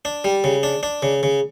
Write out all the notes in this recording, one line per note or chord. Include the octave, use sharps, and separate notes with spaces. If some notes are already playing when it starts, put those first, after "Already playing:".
D4
G3
C#3
D4
D4
C#3
C#3